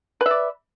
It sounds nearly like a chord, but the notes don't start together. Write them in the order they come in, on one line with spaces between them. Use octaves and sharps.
B4 E5 D5